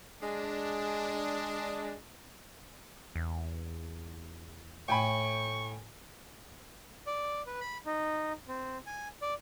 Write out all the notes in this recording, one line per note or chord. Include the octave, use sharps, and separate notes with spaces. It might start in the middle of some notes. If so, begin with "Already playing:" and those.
G#3 D4
E2
A2 G5 G#5 B5 C#6
D5
B4
B5
D#4
C4
G#5
D5